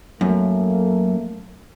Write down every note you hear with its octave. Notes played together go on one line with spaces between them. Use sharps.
F#2 A3 A#3